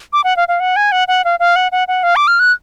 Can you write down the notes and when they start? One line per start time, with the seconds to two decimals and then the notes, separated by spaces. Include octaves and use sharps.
0.13 D6
0.24 F#5
0.37 F5
0.48 F5
0.60 F#5
0.76 G#5
0.92 F#5
1.08 F#5
1.25 F5
1.40 F5
1.56 F#5
1.72 F#5
1.88 F#5
2.03 F5
2.16 D6
2.27 F6
2.40 F#6